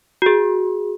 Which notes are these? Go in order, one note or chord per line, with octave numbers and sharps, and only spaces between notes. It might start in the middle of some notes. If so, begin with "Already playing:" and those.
F#4 G#4